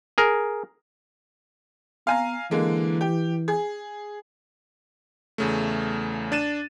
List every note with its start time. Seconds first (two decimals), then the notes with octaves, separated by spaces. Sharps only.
0.18 G#4 A#4
2.07 B3 F5 G#5 A#5
2.51 D3 E3 G#3 A#3
3.01 G4
3.48 G#4
5.38 E2 C#3 A3
6.32 D4 A6 D#7 E7